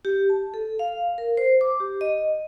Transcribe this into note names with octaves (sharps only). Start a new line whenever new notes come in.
G4
A5
A4
F5
A#4
C5
D6
G4
D#5